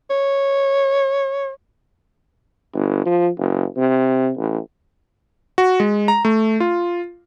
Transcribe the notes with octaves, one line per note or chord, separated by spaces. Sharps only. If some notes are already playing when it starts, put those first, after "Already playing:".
C#5
G1
F3
F#1
C3
A1
F#4
G#3
A#5
A3
F4